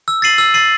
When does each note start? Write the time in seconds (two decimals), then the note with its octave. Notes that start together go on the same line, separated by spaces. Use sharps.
0.08 E6
0.22 A6 C7 D#7 F#7
0.38 E6
0.54 A6 C7 D#7 F#7